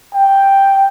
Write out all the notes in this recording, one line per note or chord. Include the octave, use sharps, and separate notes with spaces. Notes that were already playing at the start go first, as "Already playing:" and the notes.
G5